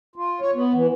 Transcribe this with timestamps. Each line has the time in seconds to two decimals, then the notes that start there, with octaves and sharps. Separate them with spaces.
0.16 F4
0.41 C#5
0.55 B3
0.74 E3